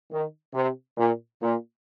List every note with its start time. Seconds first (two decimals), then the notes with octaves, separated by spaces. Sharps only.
0.11 D#3
0.54 C3
0.97 A#2
1.41 A#2